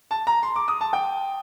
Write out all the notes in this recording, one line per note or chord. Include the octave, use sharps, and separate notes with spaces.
A5
A#5
C6
D6
D#6
A5
G5